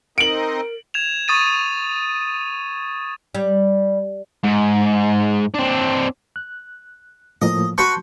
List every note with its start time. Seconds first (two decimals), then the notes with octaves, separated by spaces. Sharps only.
0.18 C4 D#4 A#4 D#5 D7 F#7
0.94 G#6 E7 F7
1.28 C#6 D#6 A6 D#7
3.35 G3
4.44 G#2
5.55 C4 D4
6.36 F#6
7.42 A2 F3 A#3 D#5
7.78 F#4 B4 A5 C6 C#6 G6